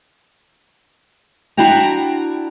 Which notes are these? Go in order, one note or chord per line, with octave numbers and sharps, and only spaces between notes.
D4 E4 F#4 G5 A#5